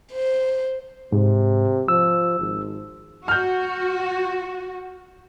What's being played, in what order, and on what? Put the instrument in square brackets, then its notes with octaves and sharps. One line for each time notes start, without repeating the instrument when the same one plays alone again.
[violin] C5
[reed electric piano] G#2 [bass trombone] C3
[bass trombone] F3 [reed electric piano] E6
[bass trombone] G#1
[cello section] F#4 [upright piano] F6 G6